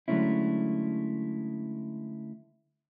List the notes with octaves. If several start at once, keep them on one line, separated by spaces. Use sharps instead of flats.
D3 F#3 G#3 A3 C#4 E4